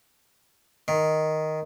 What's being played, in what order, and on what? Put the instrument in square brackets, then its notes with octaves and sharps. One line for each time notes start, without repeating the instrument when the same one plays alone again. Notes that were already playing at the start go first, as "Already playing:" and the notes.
[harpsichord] D#3